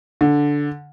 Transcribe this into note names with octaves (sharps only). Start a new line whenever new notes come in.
D3